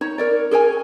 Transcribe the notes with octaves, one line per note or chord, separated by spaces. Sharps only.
D#4 C#5
A#4 C#5 D5
G#4 A#4 C#5 G#5